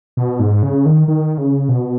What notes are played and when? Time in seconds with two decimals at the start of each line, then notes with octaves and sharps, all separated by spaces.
0.17 B2
0.39 G#2
0.63 C#3
0.86 D#3
1.08 D#3
1.38 C#3
1.69 B2